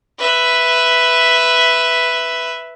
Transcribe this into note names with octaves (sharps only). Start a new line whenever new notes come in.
B4 E5